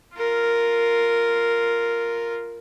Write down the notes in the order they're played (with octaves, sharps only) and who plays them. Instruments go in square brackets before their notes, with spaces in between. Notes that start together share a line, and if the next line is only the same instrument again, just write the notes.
[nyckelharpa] F4 A#4